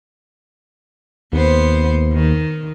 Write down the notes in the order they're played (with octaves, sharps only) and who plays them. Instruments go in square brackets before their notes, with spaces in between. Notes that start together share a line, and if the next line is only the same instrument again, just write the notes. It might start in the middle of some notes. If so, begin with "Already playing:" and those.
[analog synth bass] D#2 [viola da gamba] B3 C5
[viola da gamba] D#3